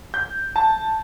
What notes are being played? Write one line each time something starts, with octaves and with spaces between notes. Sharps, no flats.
G6
A5